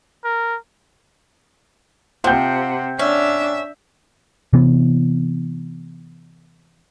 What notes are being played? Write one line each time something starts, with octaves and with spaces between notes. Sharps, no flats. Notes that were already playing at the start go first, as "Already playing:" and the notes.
A#4
C3 F3 F#5 G5 G6
C#4 D4 E5
C3 E3 B3